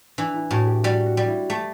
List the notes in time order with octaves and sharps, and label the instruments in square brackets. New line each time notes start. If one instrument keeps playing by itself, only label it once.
[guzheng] E3 [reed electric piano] D4
[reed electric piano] E4
[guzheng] A2 [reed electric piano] F#4
[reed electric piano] G4
[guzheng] G3 [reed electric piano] F#4
[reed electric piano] F#4
[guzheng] G3
[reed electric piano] E4
[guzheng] A3 [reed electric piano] G4